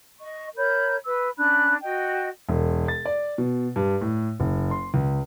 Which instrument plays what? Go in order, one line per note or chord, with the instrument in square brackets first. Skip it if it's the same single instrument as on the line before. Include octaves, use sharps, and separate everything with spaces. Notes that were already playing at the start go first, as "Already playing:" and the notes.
[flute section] D#5 C#6
A#4 C#5 B5 G6
B4 E6
C#4 D4 B5 F#6
F#4 D#5 G5
[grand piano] E1
A6
D5
B2
G2
A2
F#1
C6
C#2